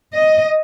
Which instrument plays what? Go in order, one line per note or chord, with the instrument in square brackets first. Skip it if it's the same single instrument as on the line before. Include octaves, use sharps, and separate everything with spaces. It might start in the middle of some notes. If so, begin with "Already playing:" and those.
[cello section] D#5